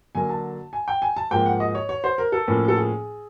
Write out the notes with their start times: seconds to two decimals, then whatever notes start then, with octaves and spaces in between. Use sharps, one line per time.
0.15 D3 F#3 A#3 G#5
0.29 A5
0.73 G#5
0.88 G5
1.02 G#5
1.17 A5
1.31 G#2 F3 A#3 G5
1.46 F#5
1.60 D#5
1.75 C#5
1.89 C#5
2.04 C5
2.18 A#4
2.32 A4
2.48 A2 F3 A#3 C#4
2.68 A4
2.76 G#4